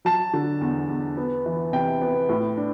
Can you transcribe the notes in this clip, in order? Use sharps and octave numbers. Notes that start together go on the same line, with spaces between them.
F#3 A5
D3
E2
E2
B3
E3
C3 G5
B3
A2
D4